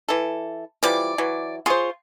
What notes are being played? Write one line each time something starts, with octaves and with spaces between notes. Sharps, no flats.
E3 A4
E3 F3 G3 D5 D6
E3 F#3
F4 G#4 C5 C#5